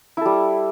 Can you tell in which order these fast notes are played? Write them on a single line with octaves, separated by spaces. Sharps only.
E4 A4 G3